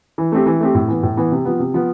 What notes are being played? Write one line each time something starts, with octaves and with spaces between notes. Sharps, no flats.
E3
A3 C4 G4
E3
A3 C4 G4
A2
E3 B3
A2
E3 B3
C3
F3 B3
C3
F3 B3